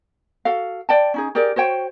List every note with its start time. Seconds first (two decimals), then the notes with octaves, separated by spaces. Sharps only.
0.45 F#4 A4 F5
0.89 D5 G5 A5
1.14 C#4 D#4 G#4
1.35 G4 G#4 A#4 D5
1.56 F#4 C5 C#5 G5